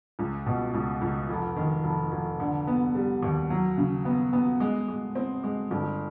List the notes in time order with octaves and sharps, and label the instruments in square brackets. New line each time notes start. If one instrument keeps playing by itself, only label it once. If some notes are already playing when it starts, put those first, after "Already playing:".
[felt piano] C#2
B2
C#2
C#2
F1
D#3
F1
F1
D3
B3
G3
D#2
F#3
C#3
B3
B3
G#3
G#3
C4
G#3
G1